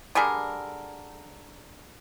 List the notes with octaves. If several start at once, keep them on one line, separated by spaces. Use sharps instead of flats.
D3 G3 G#4 A#4